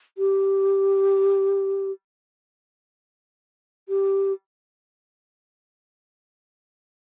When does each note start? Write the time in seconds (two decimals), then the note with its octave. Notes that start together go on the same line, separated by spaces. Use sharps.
0.18 G4
3.89 G4